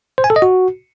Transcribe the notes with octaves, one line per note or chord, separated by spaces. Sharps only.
C5
G#5
A4
D#5
F#4